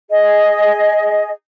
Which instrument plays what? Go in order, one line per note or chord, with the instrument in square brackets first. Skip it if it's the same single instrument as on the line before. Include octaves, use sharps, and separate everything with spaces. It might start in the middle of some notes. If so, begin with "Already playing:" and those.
[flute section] G#4 D#5